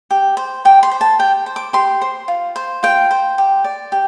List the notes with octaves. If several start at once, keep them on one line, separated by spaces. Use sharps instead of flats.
G4
C5
G4 G5
C6
C5
A5
G4 G5
C5
D6
G4 C6
C5
F4
C5
F4 G5
C5
G4
D5
G4